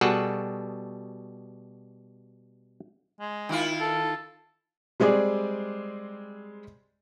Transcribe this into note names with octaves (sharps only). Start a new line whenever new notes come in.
B2 G3 F#4 G#4 A4 F#5
G#3
D#3 E4 F4
A4
G3 G#3 C4 G#4 D5